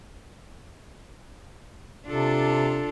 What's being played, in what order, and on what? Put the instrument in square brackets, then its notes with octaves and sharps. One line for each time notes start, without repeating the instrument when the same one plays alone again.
[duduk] C3 [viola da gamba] D4 F4 A4